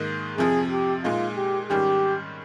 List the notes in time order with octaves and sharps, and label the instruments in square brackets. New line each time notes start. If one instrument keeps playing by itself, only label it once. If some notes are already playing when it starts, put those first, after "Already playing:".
Already playing: [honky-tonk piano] G#2 D#3 A#3 D#4
[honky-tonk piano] F2 C3 F3 [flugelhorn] G#4
[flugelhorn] G4
[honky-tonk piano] A#2 G#3 D#4 [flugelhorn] F4
[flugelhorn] G4
[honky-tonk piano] G#2 D#3 G3 C#4 [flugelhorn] G4